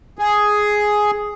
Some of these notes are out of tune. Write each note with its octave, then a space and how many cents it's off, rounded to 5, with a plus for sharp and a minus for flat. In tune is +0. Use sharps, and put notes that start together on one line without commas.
G#4 +5